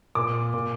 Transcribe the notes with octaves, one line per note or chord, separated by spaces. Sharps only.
A#2 D6
A#2